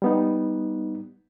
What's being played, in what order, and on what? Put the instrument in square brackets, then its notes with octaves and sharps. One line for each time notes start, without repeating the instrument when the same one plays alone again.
[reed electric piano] G3 B3 D#4